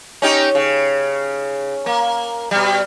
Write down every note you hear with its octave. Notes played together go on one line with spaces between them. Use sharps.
C#4 D#4 G4
C#3
A#3
B2 G3